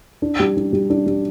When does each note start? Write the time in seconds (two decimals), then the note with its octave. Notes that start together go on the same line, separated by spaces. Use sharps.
0.22 D4
0.40 G3
0.57 D4
0.73 G3
0.90 D4
1.06 G3